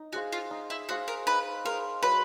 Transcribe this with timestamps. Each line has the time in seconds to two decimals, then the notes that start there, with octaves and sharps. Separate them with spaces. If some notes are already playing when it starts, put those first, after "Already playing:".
Already playing: D#4
0.13 F#4 G#4 C5 F5
0.32 F4
0.51 D#4
0.70 E4
0.89 F#4 G#4 C5 F5
1.08 A#4
1.27 D#4 B4
1.65 G#4 A#4 C5 F5
2.03 F#3 B4